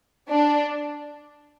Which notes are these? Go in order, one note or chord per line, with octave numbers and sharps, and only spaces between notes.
D4